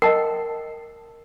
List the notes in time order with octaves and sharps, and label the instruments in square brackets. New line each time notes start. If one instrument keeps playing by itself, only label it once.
[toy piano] A#4 F#5 G5 [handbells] D#5 A5 C7